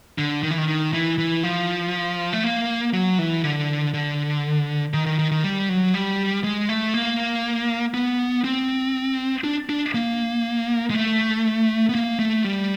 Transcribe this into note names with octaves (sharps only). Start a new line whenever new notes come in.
D3
D#3
E3
D#3
D#3
E3
E3
F3
A3
A#3
F#3
E3
D3
D3
D#3
D#3
D#3
D#3
G3
F#3
G3
G#3
A3
A#3
B3
C4
D4
D4
A#3
G#3
A3
B3
A#3
A3
G3